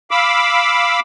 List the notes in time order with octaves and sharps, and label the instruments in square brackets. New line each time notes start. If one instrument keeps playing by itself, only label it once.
[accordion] F5 B5 D6 E6